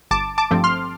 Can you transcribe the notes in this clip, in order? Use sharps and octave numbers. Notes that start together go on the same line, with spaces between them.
G1 A5 D6
A5 D6
G2 F3 A3 C4
C6 F6